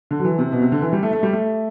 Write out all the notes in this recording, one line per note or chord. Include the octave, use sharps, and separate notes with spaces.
D3
F#3
E3
C3
B2
C3
D3
E3
G3
A3
A3
G3
A3